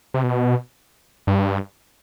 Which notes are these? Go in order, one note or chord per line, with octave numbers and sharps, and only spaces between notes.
C3
B2
G2